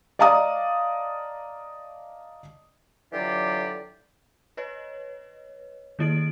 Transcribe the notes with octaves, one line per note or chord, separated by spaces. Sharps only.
D5 D#5 F5 A5 A#5 D#6
D3 E3 F#3 F4 G4 D5
B4 C#5 D#5
D#3 A#3 E4 D#5 D7